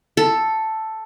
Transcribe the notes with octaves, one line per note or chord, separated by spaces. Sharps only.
A4